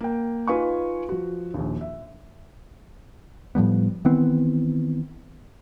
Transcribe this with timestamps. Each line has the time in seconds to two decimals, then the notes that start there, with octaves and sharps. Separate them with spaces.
0.01 A#3 G5
0.48 D#4 F4 B4 F5 G#5 C#6
1.09 F3 F#4
1.54 A#1 D#2
1.81 E5
3.55 A2 F3 G3 B3
4.05 D#3 E3 B3 C4